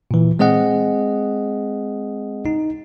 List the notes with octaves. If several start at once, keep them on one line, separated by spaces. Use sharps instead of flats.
A#2 E3
G#3 C4 G#4 D#5 F#5
D#4